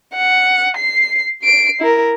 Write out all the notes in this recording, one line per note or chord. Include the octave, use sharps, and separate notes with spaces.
F#5
C7
C7 D7
E4 A#4